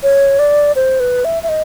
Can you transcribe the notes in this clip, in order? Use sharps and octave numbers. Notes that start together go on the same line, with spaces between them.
C#5
D5
C5
B4
E5
E5
D#5